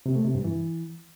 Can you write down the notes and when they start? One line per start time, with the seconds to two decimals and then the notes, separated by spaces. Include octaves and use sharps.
0.06 C3
0.15 A3
0.25 C3
0.35 G2
0.44 E3